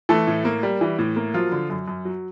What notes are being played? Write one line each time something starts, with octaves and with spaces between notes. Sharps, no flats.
E3 A3 A4
A2
A#3
G3
E3
A2
A#3
F3 F#3 F4
D3
F#2
F#2
F#3